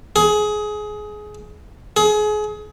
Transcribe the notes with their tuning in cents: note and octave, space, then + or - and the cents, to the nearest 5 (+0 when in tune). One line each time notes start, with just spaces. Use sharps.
G#4 +20
G#4 +30